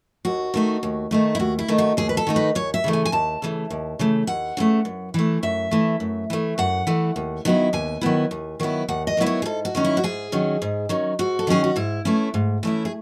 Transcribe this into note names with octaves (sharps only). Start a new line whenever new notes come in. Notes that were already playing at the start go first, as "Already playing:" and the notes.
D#2 F#4
D#3 A3 D#4
D#2
D#3 A3 D#4
E4
D#2 F#4
E4
D#3 A3 D#4
F#4
D#2 G#4
B4
A4
D#3 A3 D#4
B4
D#2 C#5
E5
C#3 E3 A3
G#5
G#5
D#2 A5
C#3 E3 A3
D#2
C#3 E3 A3
D#2 F#5
C#3 E3 A3
F#2
E3 A3
F#2 E5
E3 A3
F#2
E3 A3
F#2 F#5
E3 A3
D#2
D#3 F#3 B3 E4
D#2 G#5
D#3 F#3 B3 E4
D#2
D#3 F#3 B3 E4
D#2 F#5
D#5
D#3 F#3 B3 E4 B4
C#5
G#4
G#2 A4
F#4
D#3 F#3 C#4
E4
F#4
G#2 G#4
D#3 F#3 C#4
G#2
D#3 F#3 C#4
G#2 F#4
A4
D#3 F#3 C#4 G#4
F#4
G#2 E4
E3 A3 C#4 E4
G#2
E3 A3 C#4 E4
G#4